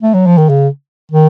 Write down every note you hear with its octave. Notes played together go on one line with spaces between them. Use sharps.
A3
F#3
F3
D#3
C#3
D#3